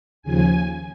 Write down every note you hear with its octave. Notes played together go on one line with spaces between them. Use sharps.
D#2 C#3 F3 G#5